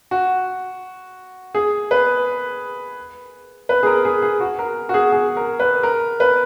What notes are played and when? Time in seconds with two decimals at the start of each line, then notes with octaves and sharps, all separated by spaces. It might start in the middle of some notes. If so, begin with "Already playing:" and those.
0.11 F#4
1.55 G#4
1.91 B4
3.69 B4
3.83 G#4
3.87 A#4
4.05 G#4
4.22 G#4
4.40 F#4
4.59 A#4
4.89 F#4
4.94 G#4
5.12 G#4
5.37 A#4
5.60 B4
5.83 A#4
6.20 B4